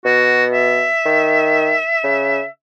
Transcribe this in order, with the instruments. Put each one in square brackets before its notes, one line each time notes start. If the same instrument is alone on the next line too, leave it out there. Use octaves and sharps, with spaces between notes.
[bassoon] B2 [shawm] F#4
[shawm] E5
[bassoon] D#3
C#3